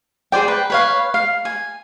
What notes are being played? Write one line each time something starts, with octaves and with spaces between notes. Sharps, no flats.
G#4 C5 D5 G5
B4 G5
B4 C#5 F5
F5
G#5